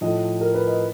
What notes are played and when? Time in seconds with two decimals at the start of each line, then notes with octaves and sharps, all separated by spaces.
0.01 A2 F3 A3 D#5
0.41 A#4
0.54 B4
0.67 D#5